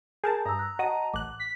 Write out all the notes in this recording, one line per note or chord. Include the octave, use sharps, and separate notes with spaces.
G#4 A#4 A5 G6
G2 A#5 D#6 E6
F#6
F#4 D#5 F#5 A5 D#6
A1 D6 F#6
B6